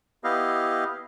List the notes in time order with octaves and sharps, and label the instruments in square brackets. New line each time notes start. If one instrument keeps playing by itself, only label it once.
[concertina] B3 E4 G4 D#5 F5